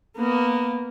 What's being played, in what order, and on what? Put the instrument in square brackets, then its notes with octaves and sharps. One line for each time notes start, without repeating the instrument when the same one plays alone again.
[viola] A#3 B3